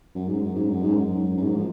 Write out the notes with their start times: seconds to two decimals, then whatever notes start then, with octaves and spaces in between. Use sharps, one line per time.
0.15 F#2
0.28 G#2
0.42 F#2
0.55 G#2
0.70 F#2
0.82 G#2
0.96 F#2
1.37 F#2
1.42 G#2
1.56 F3